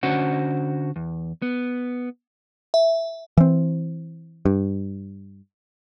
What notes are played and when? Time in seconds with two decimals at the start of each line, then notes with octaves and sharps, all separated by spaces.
0.03 D3 C#4 F#4 C5 F#5
0.96 E2
1.42 B3
2.74 E5
3.37 E3 C4
4.45 G2